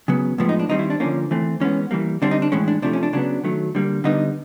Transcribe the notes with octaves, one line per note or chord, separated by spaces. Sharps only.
C#3 F#3 B3
A2 F3 G#3 B3
D#4
D4
D#3 G3 C4 D#4
E4
D4
D3 F3 A#3 C#4
E3 A3 C4
E3 G#3 B3 C#4
E3 G3 A#3
D3 G3 C4 D4
D#4
D4
A2 E3 G#3 C#4
D4
C3 F3 A3 D4
C#4
D4
C#3 F#3 B3 D4
D#3 F#3 A3
D3 G3 A#3
D3 G3 B3 D#4